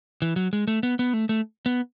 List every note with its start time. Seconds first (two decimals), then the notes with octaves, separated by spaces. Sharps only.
0.22 E3
0.36 F#3
0.53 G#3
0.68 A3
0.83 B3
0.99 B3
1.13 A3
1.29 A3
1.66 B3